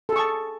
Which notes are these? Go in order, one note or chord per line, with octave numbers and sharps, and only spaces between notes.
G#4 A4 A5 C#6